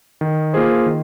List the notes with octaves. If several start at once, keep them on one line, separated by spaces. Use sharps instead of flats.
D#3
A#3 F4 G#4 C5
D#3